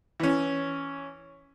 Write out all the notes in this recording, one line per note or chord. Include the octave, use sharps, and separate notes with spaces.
E3 C#4